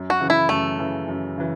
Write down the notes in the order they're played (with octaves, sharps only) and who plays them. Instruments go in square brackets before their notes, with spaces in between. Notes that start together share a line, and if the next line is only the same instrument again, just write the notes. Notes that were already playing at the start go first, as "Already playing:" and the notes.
Already playing: [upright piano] F#2
[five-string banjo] F#4
[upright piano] C#3 E3
[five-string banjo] E4
[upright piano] F#2 [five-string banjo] A3
[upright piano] C#3 E3
F#2
C#3 E3